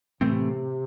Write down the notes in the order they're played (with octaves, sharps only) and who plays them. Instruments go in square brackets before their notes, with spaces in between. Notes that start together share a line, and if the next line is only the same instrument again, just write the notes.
[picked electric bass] A2 E3 A3 C4 [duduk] C3